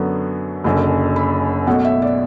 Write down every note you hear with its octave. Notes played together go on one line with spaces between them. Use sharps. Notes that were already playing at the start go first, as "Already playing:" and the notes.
Already playing: F#2 D3 F#3 B3
F#1 F#2 D3
B5
B1 B2 A3 F#5
E5
D5